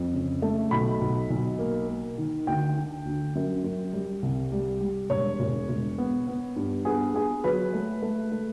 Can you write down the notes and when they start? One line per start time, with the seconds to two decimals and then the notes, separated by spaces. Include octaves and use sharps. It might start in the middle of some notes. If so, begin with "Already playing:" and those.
Already playing: F2
0.14 C#3
0.42 A3
0.71 B1 B5
1.01 B1
1.30 B1
1.59 A#3
1.88 A#3
2.18 D#3
2.47 D2 G5
2.77 D3
3.05 D2
3.35 F#2
3.64 F#2
3.93 G3
4.22 C2
4.52 G3
4.81 G3
5.10 E1 C#5
5.40 E1
5.69 E1
5.98 B3
6.28 B3
6.56 G2
6.85 B3 G#4
7.14 B3 G#4
7.44 F#3 B4
7.73 A3
8.02 A3
8.32 A3